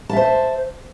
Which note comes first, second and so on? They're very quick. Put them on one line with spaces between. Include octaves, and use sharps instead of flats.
A5 E5 C5